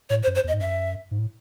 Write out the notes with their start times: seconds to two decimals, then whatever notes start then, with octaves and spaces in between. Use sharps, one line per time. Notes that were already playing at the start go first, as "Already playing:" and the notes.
0.10 A2 C#5
0.23 C5
0.27 F#2
0.35 C5
0.44 E2 D#5
0.54 G#2
0.60 F#2 E5
1.11 G#2
1.18 A2